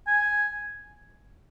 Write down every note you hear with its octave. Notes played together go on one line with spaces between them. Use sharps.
G#5